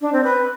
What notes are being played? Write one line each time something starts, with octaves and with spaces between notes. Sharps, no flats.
D4
C4
B4